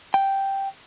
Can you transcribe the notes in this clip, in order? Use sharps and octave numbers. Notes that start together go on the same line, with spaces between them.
G5